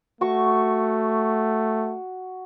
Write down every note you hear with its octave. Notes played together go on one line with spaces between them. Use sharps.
A3 F#4 C#6